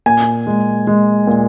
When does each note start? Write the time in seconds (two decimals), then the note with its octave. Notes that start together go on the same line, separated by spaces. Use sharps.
0.06 A#2 G#5
0.47 G#3
0.87 G#3
1.27 A#2